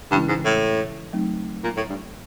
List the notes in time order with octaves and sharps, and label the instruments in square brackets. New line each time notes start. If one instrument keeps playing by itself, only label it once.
[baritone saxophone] G2 [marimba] C#3 E3 G#3 C#4 E4
[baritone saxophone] G#2
A2
[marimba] F#3 A3 C4 D#4
[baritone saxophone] A#2
A2
G2